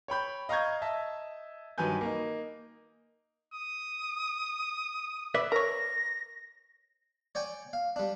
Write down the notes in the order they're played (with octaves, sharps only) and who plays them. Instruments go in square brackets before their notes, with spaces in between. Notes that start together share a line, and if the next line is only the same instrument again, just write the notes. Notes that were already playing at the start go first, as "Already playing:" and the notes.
[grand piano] C#5 G5 B5 G6
D#5 F5 A#5 C#6 G6 G#6
D#5 E5 A5
G2 D#3 F#3 B4 G#5 G6
A#3 D#4
[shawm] D#6
[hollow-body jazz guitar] B4 D5 E5
[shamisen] A#4 C#5 [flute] A#6
[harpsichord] C#5 D5 G5 G#5
F5
G3 D4